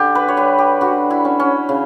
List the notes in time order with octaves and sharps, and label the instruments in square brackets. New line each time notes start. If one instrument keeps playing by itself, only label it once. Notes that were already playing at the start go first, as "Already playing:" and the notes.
Already playing: [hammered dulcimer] D3 G4
B4
C#5
G3 B4
G4
D3 F#4
E4
C#4
C#4
C#3